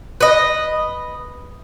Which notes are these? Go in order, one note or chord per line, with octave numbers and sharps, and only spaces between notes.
B4 D#5